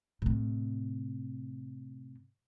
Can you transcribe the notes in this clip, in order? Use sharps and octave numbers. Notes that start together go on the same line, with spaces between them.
A2 C3